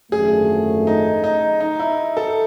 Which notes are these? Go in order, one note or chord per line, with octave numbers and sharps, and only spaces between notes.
G#1 F#2 D3 F3 A3 G#4
D#4
D#4
D#4
E4
A4